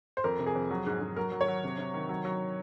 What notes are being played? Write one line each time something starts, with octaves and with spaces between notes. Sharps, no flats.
C5
F2 A#4
C3
G#4
F2
F#3
G#2
G#2
F#3 A#4
F#3
C#5
F#3
C3
C3
D#3
F#3
F#3